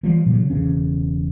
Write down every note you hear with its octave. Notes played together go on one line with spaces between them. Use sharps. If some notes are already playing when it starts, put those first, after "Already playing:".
E3 F3 G3
A#2 C#3 F#3
E1 E2 C#3 C#4